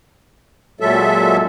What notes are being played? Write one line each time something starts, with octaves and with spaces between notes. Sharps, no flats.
A#2 F#3 G#3 A4 E5